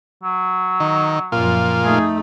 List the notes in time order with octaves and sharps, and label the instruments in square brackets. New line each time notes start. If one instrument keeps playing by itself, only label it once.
[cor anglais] F#3
[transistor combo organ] D#3
[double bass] F#2 F3 [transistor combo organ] A#2 F4
[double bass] A3 D#4 [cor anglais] G#4